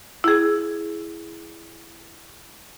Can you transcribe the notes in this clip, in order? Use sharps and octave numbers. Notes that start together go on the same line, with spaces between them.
E4 G#4